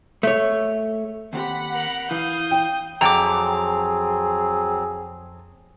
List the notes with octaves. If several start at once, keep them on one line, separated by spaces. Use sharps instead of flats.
A3 C#5
D#2 C4 G4 F#5 B5
A#4 F#6
E3 F5 D#6 G6
G5
F2 F#3 C4 G#4 G5 A#5 D6